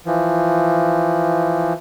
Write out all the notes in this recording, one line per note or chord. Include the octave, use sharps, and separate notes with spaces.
E3 F3